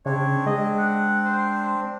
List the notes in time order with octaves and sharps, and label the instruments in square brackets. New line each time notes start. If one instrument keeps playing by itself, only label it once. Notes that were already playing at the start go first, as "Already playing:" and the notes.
[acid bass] C#3 [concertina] C4 D4 [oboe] C#5
[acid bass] G#3 [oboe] D#5
[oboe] F#5
C5